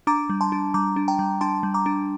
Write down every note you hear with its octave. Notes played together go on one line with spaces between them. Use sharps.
D4 A#5 D6
G3
A5 C6
D4
G3 A#5 D6
D4
G5 A#5
G3
D4 A5 C6
G3
A#5 D6
D4